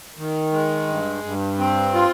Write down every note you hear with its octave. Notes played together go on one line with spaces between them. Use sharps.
D#3
G#3
G2
G2
C4
F4